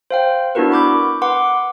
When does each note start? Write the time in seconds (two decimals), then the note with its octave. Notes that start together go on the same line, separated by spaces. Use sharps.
0.11 C5 F5 G5
0.55 B3 D4 E4 F#4 A#4 B4
0.72 B5 D6 G6
1.22 B4 F#5 C6 D6